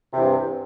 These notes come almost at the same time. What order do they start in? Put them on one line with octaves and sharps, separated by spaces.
C3 E2 G2